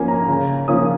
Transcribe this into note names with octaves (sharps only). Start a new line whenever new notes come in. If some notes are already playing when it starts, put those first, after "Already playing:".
Already playing: F3 A#3 C#4 G#5
A#5
C#3
F3 A#3 C#4 F4 D#6